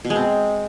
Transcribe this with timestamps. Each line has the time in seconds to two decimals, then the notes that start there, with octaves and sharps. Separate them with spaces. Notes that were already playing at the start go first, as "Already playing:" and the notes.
0.04 B2
0.10 G#3
0.16 C4